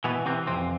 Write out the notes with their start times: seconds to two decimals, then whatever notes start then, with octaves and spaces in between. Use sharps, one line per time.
0.04 B2 E3 B3
0.26 C3 E3 C4
0.47 F2 C3 C4